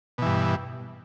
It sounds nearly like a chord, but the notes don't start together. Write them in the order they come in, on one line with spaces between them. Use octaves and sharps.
B2 E3 G2